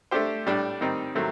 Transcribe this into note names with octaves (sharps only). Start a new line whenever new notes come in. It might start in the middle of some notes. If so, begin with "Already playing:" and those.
A3 D4 G4 C5
A2 G3 D4
D#3 G3 C4 D#4
C3 D#3 F#3 A3 C4